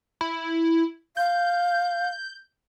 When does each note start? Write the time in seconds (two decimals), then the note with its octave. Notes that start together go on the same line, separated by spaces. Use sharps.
0.21 E4
1.17 F5 G6